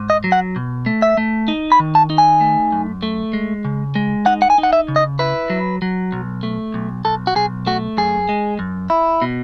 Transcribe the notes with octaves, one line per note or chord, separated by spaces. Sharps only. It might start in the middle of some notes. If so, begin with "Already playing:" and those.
Already playing: G#2
D#5
F#3
F#5
B2
A3
E5
A3
D#4
B5
D#3
A5
D#4
G#5
A3
F#2
A3
G#3
C#3
G#3
D#4 F#5
F#5
G#5
D#4
F#5
E5
C#3
D#5
E4 B4
F#3
F#3
B1
A3
B1
B1 A4
F#4
B1 G#4
A3 F#4
F#2 G#4
G#3
F#2
E4
B2